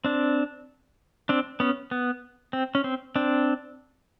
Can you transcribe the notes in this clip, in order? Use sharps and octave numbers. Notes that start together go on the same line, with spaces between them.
C4 D4
C4 D4
B3 C#4
B3
C4
C#4
C4
C4 D4